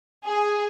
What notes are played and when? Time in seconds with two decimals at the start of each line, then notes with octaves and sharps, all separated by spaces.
0.24 G#4